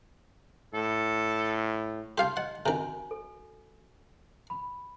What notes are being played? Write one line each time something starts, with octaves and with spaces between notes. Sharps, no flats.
A2 A4
D#4 G4 F5 G5 C6
D#5 F#5
C3 D#3 F#4 G#5
A4
B5